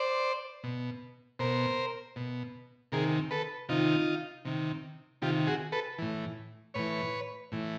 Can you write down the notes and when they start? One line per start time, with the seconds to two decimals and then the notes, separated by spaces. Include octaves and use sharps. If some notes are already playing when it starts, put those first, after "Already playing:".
Already playing: C5 D5
0.64 B2
1.39 B2 A#4 C5
2.16 B2
2.92 C3 D#3 G#4 A#4
3.31 A4 B4
3.69 C3 D#3 D#4 F4
4.45 C3 D#3
5.22 C3 D#3 F4 G4
5.47 F#4 G#4
5.72 A4 B4
5.98 A2 E3
6.74 A2 E3 B4 C#5
7.52 A2 E3